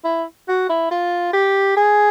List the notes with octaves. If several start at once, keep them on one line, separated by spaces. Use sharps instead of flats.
E4
F#4
E4
F4
G4
G#4